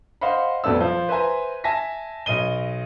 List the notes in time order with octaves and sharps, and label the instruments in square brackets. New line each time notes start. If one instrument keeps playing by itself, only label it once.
[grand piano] C5 D#5 F5 F#5 B5
F2 B2 A3 B3 D5 E6
F3
B4 C5 E5 G#5 A#5
E5 G#5 A5 A#6 B6
B1 D#5 D#7 G7